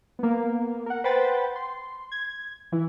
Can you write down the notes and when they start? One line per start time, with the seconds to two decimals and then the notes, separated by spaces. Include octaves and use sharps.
0.19 A#3 B3
0.86 A#4 F#5
1.04 B4 C5 F#5 G5 B5 A6
1.56 C6
2.12 G#6
2.72 E3 E4